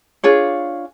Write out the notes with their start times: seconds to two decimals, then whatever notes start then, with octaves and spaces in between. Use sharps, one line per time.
0.24 D4 F4 G#4 C#5